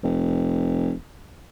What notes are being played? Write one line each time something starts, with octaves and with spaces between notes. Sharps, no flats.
F1